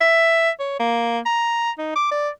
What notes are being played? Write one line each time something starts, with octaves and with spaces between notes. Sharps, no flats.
E5
C#5
A#3
A#5
D#4
D6
D5